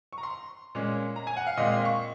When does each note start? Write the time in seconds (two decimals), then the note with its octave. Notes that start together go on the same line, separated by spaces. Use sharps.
0.13 C#6
0.18 A#5
0.23 C6
0.75 A#2 G#3 C#4
1.16 A#5
1.27 G#5
1.37 F#5
1.47 F5
1.57 A#2 G#3 C4 F4 D#5
1.71 F5
1.85 C#6